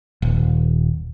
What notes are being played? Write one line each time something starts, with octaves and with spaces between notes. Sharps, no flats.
D#1